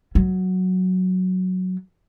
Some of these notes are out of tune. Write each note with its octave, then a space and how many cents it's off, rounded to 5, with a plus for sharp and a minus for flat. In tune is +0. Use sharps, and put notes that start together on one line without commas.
F#3 +0